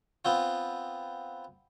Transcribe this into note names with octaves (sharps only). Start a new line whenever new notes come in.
B3 C4 F4